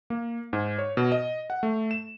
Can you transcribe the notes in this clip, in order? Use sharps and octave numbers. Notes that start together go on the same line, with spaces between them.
A#3
G#2
C#5
B2
D#5
F#5
A3
E7